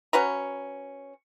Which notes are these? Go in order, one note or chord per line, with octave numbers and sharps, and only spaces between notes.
C#4 F#4 B4 A#5